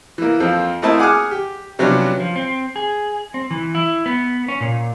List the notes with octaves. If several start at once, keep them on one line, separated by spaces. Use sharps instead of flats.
E3 A#3
F2 C4 F4 A4
A3 A#3 C4 E4 D#5 A5
G#4 F#5 G#5 D6 D#6 F6
G4
C3 F3 F#3 B3 C#4 D4
F3
C4
G#4
C4
E3
E4
B3
C#4
A#2